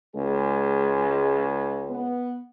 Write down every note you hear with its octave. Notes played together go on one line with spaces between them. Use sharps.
C#2 G#3 G#4
B3